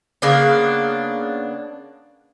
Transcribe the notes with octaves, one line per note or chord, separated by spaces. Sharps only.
C#3 A#3 B3 D4